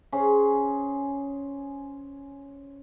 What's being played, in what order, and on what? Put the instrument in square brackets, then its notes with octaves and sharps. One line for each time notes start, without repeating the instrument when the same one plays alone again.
[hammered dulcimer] C#4 G#4 C5